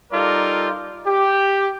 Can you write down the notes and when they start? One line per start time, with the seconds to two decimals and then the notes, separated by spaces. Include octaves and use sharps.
0.12 G3 D#4 F4 A4 A#4 D5
1.07 G4